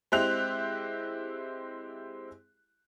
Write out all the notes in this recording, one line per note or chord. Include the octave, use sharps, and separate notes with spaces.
G#3 C4 E4 G4 F#6 F7